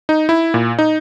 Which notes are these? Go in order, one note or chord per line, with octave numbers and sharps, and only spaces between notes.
D#4
E4
A#2
D#4